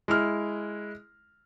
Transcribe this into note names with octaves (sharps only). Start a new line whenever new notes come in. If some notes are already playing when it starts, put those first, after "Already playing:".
G#3 E4 F6